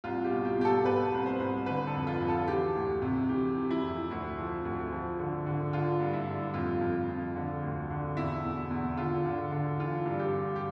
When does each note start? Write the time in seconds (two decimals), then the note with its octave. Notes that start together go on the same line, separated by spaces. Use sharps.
0.04 C2 F4
0.24 G4
0.32 B2
0.37 F4
0.45 G4
0.58 B2 G4
0.65 A4
0.85 B2 B4
1.13 C2
1.26 C5
1.40 C2
1.66 D3 B4
1.87 A4
1.95 F2
2.07 F4
2.21 F2
2.28 A4
2.48 E3 G4
2.75 D2
3.02 C3
3.29 E3 G4
3.57 E3
3.71 E4
3.83 F2
4.11 D2 E4
4.38 F3
4.65 D2
4.92 F3
5.19 D3
5.46 D3
5.73 D3 F4
6.00 G2
6.13 E4
6.28 G2
6.54 F2 F4
6.81 F2
7.08 F2
7.36 D3
7.63 D2
7.90 D3
8.17 E2 E4
8.44 B2
8.70 E2
8.97 D3 F4
9.25 D3
9.52 D3
9.79 E3 F4
10.06 G2
10.19 G4
10.33 G2
10.56 G4